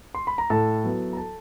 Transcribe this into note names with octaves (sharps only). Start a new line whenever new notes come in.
C6
B5
A#5
A2 A4 A5
F#3 B3 E4
A#5
A4 A5